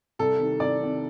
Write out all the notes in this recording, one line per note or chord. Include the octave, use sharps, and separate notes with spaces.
C2 A4
C3 D#3
C2 D5
C3 D#3